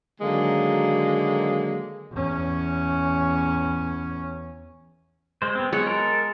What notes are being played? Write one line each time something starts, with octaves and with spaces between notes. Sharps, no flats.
D3 D#3 F#3 G#3 A#3
E2 C#4
G#3 C5
B3 C4
F#3 G#3 B3 C#5
A4 A#4